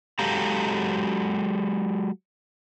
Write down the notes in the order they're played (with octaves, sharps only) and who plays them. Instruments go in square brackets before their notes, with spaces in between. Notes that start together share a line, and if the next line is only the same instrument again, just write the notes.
[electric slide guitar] F#3 G#3 G4 A4 F5 A#5